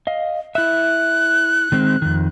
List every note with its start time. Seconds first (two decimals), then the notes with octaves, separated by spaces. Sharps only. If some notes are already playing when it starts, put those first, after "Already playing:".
0.07 D#5 F5
0.55 E4 E5 F#6
1.72 D#3 G#3 C4
2.02 F2 D#3